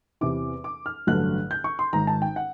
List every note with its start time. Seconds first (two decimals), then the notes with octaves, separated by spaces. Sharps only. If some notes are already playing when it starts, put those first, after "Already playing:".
0.21 E2 C3 E3 D6
0.64 D6
0.86 F6
1.07 A1 G2 D3 F#3 F#6
1.51 G6
1.64 C#6
1.79 C6
1.93 G#1 G#2 D#3 A#5
2.07 A5
2.22 G5
2.36 F#5